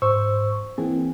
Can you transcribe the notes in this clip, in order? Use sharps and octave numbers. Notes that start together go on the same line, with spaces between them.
G#2 C5 C#6 E6
E3 A#3 C4 G#4